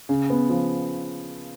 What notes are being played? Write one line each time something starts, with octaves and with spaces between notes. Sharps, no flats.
C#3
B3
F3